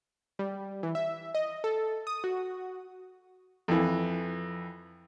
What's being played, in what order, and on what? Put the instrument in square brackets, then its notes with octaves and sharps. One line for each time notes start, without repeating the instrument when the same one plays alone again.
[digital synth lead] G3
E3
E5
D#5
A4
D#6
F#4
[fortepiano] F2 E3